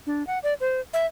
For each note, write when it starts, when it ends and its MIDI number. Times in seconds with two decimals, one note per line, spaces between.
0.07 0.26 62
0.27 0.39 78
0.43 0.54 74
0.60 0.81 72
0.93 1.06 76